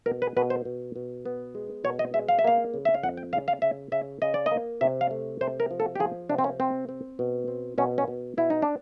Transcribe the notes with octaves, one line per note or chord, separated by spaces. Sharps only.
B2 A#4
B4
B2 B4
C5
B2
B2
B3
G#3
B2 C#5
D#5
G#3 E5
F5
E5
A#3 F5
C#3
E5
F5
F2 F#5
G5
C#3 F5
F5
C#3 E5
C#3 E5
C#3 D#5
D5
D#5
A#3
C3 E5
F5
A3
C3 C5
A#4
F3
A4
G4
F3 G#4
C3 D4
C4
C#4
C4
C4
B2
C4
B2 C#4
C#4
B2
B2 E4
D#4
D4